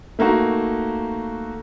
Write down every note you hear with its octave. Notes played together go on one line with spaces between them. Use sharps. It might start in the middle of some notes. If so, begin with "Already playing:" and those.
A3 A#3 D#4 F#4